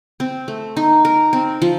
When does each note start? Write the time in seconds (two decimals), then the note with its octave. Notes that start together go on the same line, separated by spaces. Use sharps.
0.20 C4
0.48 A3
0.77 D#4
1.05 A#4
1.33 C4
1.62 F3